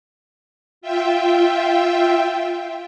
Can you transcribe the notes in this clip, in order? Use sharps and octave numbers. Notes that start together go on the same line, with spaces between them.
F4 E5 G5